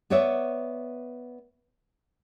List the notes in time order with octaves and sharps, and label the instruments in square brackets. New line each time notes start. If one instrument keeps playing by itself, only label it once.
[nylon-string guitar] B3 B4 C#5 D5 E5